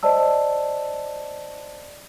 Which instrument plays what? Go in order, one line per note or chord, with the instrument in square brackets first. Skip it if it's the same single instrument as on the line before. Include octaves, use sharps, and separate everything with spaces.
[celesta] C5 D5 D#5 A5 E6